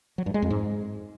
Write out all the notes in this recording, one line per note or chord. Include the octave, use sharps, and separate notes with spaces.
F#3
G2
G#3
F2
G#2